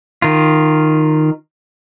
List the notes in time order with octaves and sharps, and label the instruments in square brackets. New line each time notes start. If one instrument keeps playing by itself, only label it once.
[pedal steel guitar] D#3 F4